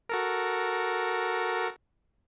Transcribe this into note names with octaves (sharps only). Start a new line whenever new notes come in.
F#4 A4 A#4